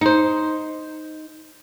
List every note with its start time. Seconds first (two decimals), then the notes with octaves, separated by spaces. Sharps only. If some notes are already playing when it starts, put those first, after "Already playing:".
0.01 D#4 C5